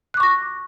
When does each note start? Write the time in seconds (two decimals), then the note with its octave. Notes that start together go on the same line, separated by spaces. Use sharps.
0.14 F#6
0.17 D6
0.20 C#6
0.23 A#6